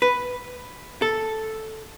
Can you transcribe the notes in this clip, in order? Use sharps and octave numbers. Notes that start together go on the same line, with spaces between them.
B4
A4